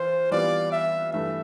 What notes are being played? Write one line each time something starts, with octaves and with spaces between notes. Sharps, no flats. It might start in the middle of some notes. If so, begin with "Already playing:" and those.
Already playing: E3 F4 C5
E3 G3 B3 F4 D5
E5
G2 E3 A3 E5